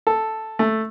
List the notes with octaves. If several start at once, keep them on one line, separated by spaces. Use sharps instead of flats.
A4
A3